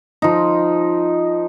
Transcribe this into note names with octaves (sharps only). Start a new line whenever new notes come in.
F3 D#4